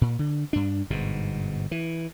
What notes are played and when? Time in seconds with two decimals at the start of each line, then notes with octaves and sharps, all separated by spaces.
0.01 A#2
0.19 D3
0.53 G2 D4
0.90 G1 G#2 B2
1.71 E3